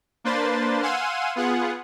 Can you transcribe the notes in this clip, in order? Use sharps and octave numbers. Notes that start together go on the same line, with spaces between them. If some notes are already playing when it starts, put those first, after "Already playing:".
A#3 D4 B4 C5 C6 A6
F5 F#5 G#5 C6 E6 D#7
B3 F4 G#4 F#5